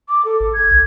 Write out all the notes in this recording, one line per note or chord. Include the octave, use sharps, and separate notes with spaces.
D6
A4
G#1
G#6
B1